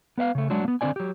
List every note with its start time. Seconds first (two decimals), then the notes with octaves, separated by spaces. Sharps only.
0.18 B3 B4 E5 F5
0.35 C#3 A3
0.50 F#3 G#3 D4 F#4
0.65 A#3 B3
0.81 D3 C4 F4 D5 G#5
0.96 F#3 G4